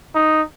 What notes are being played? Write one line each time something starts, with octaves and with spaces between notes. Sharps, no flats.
D#4